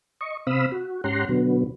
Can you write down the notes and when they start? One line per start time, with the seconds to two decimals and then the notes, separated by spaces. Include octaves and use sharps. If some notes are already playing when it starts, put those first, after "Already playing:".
0.21 D#5 C#6
0.47 C3 C4 F5 B5 D#6 E6
0.72 F#4
1.04 G#2 C#4 G4 F#5 A#5 C6
1.29 B2 D3 F#3 B3